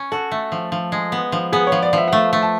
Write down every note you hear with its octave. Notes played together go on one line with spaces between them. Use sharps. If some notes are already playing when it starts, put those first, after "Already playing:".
Already playing: C#4
F#4 A4
A3
F3
F3
G#3
B3
F3
B3 G#4
C#5
F3
D5
F3 E5
F#5
A3 F5
A3
A5